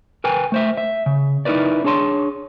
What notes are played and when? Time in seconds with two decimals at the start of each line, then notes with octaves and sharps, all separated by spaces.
0.24 A#4 B4 G5 G#5
0.52 A3 C5 E5
0.77 E5
1.06 C#3
1.45 D#4 E4 A#4 B4 D5
1.84 D4 G#4 C#5 A5 C6